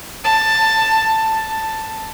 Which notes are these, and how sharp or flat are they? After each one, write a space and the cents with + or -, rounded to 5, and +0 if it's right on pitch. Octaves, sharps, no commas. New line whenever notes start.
A5 +10
A5 +5